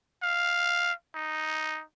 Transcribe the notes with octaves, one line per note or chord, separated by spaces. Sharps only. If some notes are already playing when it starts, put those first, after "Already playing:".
F5
D#4